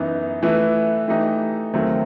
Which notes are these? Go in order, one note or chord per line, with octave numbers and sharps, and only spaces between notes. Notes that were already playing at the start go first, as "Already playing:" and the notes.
Already playing: F#2 E3 B3 D#4
E3 A3 E4 B4
E3 A3 D#4 G4
D#2 D#3 F#3 A3 C4